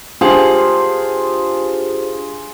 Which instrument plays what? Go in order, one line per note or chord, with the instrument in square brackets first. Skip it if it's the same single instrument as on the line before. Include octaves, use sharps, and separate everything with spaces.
[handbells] D4 G4 C5 [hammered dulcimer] F4 G#4